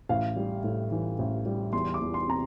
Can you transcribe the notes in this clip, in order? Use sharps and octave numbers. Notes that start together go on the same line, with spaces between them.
A1 F5
G3
A2
E3
A1
G3
E2 C6
D6
E2
C6
C3 A#5